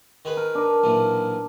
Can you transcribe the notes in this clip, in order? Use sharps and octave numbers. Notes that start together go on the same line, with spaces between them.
D#3 G#4 B4
A#4
D4 A#4
B1 A#2 E3